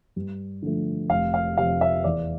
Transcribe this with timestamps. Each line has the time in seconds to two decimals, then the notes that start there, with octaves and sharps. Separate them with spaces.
0.16 G2
0.62 D3 F3 A3
1.10 F1 F5
1.34 F5
1.57 F2 C3 F5
1.81 E5
2.04 E2 D5